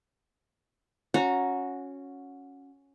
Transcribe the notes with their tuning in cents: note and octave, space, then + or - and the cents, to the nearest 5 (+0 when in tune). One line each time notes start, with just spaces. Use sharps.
C#4 +0 F#4 -20 A#5 +0